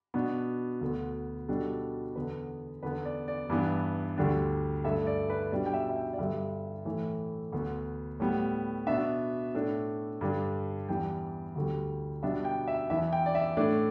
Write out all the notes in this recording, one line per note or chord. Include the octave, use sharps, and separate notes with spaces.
B2 B3 D4
D2 D3 B3
B2 G3 D4 A4
E2 D3 B3 B4
E2 D3 B3 B4
D5
D5
G2 E3 B3 D4
D2 D3 G3 D4
G2 D3 A3 E5
D5
B4
B2 G3 D4 D5
G5
E5
E5
G5
D5
G2 D3 G3 E5
A2 E3 A3
D2 D3 B3
A2 G3 B3
B2 B3 D4 E5
A2 A3 D4
G2 D3 G3 D4
E2 E3 G3 G5
D2 D3 G3
B2 G3 B3 D4 E5
G5
E5
E2 E3 B3 E5
G5
D5
E5
A2 A3 D4 D5